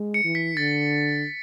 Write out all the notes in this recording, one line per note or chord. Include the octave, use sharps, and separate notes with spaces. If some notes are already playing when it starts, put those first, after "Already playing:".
Already playing: G#3
C#7
E3
B6
D3 A6